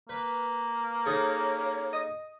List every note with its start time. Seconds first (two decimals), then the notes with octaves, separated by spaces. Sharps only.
0.09 A#3 B4
1.06 D#4 G#4 A4 C#5
1.93 D#5 D#6